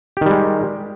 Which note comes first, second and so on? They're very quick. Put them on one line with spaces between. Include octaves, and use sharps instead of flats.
G4 D#3 G3 G#3